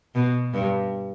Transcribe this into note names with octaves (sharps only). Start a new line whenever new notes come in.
B2
G2